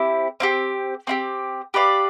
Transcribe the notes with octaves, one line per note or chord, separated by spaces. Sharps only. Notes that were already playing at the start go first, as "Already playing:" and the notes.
Already playing: C4 E4 G4
C4 E4 G4
C4 E4 G4
G4 B4 D5 F5